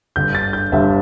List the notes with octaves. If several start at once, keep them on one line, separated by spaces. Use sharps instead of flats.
G1 G2 D3 G3 G6
A6
G6
G1 G2 D3 G3 E5